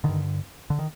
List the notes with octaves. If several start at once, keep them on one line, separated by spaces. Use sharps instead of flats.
G2 D3 D#3
D3
D#3